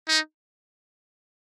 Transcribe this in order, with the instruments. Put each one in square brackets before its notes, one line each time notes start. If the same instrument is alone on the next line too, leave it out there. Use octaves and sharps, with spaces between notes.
[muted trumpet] D#4